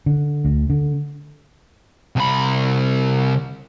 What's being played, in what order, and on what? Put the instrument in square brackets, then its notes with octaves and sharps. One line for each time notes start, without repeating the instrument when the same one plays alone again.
[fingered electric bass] D3
D2
D3
[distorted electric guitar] C2 B5